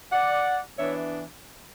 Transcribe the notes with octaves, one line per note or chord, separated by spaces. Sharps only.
D5 F#5
E3 B3 D4 C#5 E5